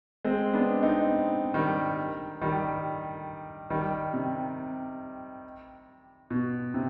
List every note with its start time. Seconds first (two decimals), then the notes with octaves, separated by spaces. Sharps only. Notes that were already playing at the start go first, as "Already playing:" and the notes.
0.25 G#3 C4
0.54 B3 D4
0.83 C4 D#4
1.54 D#3 G3
2.41 D#3 G3
3.70 D#3 G3
4.14 C3
6.30 B2
6.74 C3